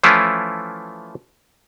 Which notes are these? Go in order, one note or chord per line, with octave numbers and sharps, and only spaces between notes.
E3 F3 A3 C#4 E4 F4